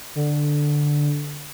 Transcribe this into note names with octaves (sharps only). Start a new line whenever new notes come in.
D3